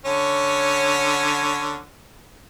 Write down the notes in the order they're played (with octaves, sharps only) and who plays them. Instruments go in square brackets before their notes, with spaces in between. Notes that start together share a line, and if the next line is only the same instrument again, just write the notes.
[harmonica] D3 C#4 C#5